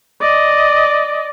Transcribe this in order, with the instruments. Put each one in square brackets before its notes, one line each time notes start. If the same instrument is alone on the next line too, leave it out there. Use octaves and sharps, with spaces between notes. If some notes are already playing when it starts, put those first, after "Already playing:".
[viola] D5 D#5